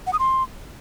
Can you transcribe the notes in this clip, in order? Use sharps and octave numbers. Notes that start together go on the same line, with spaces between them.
F#5
D#6
C6